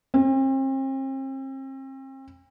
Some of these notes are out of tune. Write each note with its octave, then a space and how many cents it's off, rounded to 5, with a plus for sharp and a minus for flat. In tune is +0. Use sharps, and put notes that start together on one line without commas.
C4 +40